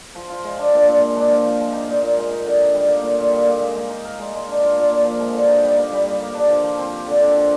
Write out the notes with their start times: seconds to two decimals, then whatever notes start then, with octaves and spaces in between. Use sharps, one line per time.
0.15 F3
0.30 F4
0.44 G#3
0.58 D4
0.73 A#2
0.87 A#2
1.01 G#3
1.16 D4
1.31 F3
1.45 F3
1.59 G#3
1.73 D#4
1.88 A#2
2.02 A#2
2.17 G#3
2.31 D#4
2.45 D3
2.60 D#4
2.74 G3
2.88 A#3
3.03 A#2
3.18 A#2
3.31 G3
3.46 A#3
3.61 G#3
3.75 G#3
3.90 D#4
4.04 A#4
4.19 G#3
4.33 G#3
4.48 D4
4.62 F4
4.77 A#2
4.91 A#2
5.04 F3
5.19 G#3
5.33 D3
5.48 D#4
5.63 G3
5.77 A#3
5.92 G3
6.06 G3
6.20 A#3
6.35 D4
6.49 F3
6.64 F3
6.78 C4
6.92 G4
7.07 D3
7.21 D3
7.36 F3